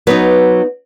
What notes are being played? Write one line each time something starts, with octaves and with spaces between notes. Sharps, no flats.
F#3 B3 D#4 B4